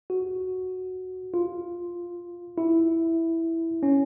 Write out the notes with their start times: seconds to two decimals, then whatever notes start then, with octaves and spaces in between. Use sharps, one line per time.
0.10 F#4
1.34 F4
2.58 E4
3.83 C#4